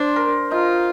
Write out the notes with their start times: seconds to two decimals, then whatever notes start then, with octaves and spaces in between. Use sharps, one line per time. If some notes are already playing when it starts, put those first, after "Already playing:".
Already playing: D4 C5
0.16 A#4
0.51 D#4 F4